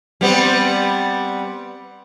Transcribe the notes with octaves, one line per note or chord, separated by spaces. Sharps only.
G3 B3 C4